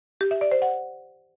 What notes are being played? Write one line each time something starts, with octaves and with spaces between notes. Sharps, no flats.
G4
E5
D5
C5
F#5